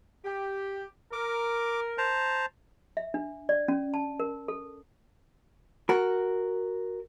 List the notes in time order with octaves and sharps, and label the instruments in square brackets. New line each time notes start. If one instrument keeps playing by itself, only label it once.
[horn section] G4
[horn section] A#4 [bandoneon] D6
[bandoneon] C5 A5 A#5
[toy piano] E5
D4
D5
C#4
A5
A#4
A4
[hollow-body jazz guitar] F#4 A#4